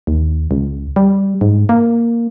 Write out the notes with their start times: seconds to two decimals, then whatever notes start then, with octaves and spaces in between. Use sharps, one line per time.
0.07 D#2
0.51 C#2
0.96 G3
1.41 G#2
1.69 A#3